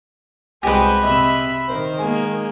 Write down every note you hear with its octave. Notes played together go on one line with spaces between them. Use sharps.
C2 G#3 F#4 G4 B4 C5 G#5
C3 D#5 E5 B5
D#3 A#4 C5
G#3 A#3 G#5